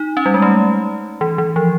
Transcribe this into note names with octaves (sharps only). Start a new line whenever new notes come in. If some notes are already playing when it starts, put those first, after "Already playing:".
Already playing: D#4
C#4
G3
G#3
A3
E3
E3
F3